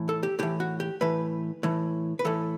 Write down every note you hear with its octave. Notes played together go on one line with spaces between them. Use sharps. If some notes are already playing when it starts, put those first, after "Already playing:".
Already playing: A2 E3
A4
G4
A2 E3 G4
F#4
G4
A2 E3 B4
A2 E3
B4
A2 E3 A4